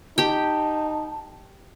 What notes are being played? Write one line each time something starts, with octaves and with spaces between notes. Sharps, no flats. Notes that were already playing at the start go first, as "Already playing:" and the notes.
D#4 G4 G5 A5